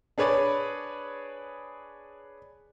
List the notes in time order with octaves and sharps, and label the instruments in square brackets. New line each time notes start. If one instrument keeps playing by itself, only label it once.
[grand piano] D4 G#4 B4 C#5 D5